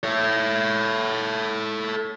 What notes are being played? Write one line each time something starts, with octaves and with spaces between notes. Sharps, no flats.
A4 C#5